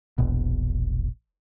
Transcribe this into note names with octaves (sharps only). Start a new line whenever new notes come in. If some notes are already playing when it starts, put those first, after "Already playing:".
E1 A#1 B2